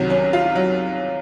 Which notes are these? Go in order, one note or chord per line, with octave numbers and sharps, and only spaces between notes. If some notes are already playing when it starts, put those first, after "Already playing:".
Already playing: C2 C3 D#3 F#3
C#4
F4
F#3